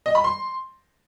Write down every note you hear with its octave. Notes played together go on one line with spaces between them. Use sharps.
D#5
B5
C6